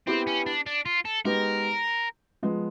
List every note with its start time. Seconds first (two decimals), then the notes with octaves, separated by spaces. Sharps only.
0.07 B3 C4 E4 G4 B4
0.27 C#4
0.46 D4
0.66 D4
0.86 F4
1.05 A4
1.25 G#3 B3 D#4 G4 A#4 B4
2.43 F3 G#3 B3